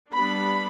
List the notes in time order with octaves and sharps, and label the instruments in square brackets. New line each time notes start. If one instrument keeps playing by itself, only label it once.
[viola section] G3 B3 D4 B5